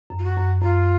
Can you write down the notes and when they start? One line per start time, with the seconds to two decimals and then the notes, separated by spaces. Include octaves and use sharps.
0.10 F#2
0.19 F4
0.23 F#4
0.37 F#2
0.62 F#2 F4